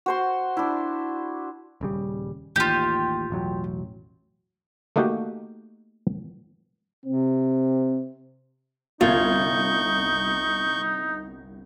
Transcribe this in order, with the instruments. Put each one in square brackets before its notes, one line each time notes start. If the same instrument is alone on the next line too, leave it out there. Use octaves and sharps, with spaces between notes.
[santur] F#4 C5 C6
D4 E4
[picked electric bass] D#1 C#3 G3
[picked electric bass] A1 D#2 [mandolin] F4 G4
[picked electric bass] E1 A1 F#3
[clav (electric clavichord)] A3 A#3 D#4 F#4 G4 G5
[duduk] C3 [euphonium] C4
[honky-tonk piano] G1 C2 G#6 [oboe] D#4 [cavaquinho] F4 [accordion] C#6 G6